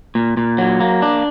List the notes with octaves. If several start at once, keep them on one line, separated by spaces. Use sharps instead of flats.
A#2
A#2
F#3
A#3
D4